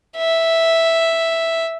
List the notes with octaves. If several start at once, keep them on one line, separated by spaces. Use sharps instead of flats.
E5